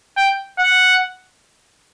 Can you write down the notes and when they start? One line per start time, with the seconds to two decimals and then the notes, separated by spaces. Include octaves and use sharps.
0.17 G5
0.59 F#5